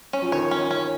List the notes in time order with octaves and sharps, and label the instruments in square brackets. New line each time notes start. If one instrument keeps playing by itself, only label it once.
[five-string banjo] C#4
[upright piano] F3
[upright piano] D#3 [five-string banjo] C#5
[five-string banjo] C#4
C#4